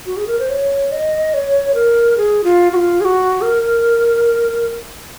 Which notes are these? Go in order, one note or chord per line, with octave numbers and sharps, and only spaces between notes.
F#4
G#4
A#4
C5
C#5
D#5
C#5
A#4
G#4
F4
F#4
F4
G#4
F#4
A#4